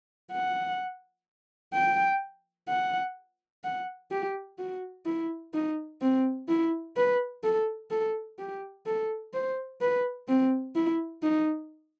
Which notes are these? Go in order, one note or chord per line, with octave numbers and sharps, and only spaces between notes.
F#5
G5
F#5
F#5
G4
F#4
E4
D#4
C4
E4
B4
A4
A4
G4
A4
C5
B4
C4
E4
D#4